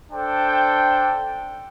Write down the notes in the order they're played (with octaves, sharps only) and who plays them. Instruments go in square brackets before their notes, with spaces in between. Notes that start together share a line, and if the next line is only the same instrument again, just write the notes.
[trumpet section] D4 A4 C5 G5